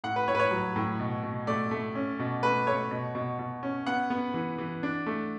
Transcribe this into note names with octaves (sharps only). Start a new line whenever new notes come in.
A2 F#5
B4
A2 C#5
B4
C#5
F#3
A2
B2
B2
A3 D5
A3
C#4
B2
A3 B4
A3 C#5
B2
B2
B2
C#4
B3 F#5
B3
E3
E3
D4
A3